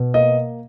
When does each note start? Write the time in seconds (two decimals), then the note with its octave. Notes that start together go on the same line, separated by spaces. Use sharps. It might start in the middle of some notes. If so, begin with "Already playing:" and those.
Already playing: B2
0.14 A#3 D#5